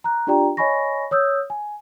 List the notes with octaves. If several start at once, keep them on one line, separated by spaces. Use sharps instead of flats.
A#5 F#6
D4 F4 G4 D5 G5 A#5
C#5 D#5 G#5 B5 C#6 A#6
C#5 D#6 E6 G6
G#5